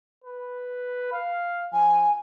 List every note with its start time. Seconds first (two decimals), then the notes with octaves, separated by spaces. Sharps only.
0.24 B4
1.12 F5
1.73 F3 G#5